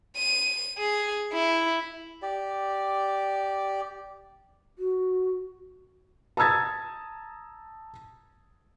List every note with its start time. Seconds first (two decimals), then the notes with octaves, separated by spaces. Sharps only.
0.17 D#7
0.78 G#4
1.33 E4
2.22 G4 D5
4.79 F#4
6.37 A5 A#5 D#6 E6 G#6 A6